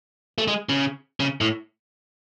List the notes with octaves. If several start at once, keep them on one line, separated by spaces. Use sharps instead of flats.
A3
G#3
C#3
C#3
A2